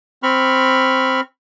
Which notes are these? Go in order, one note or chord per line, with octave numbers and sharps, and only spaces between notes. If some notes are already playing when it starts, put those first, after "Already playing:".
C4 B5 C#6 F6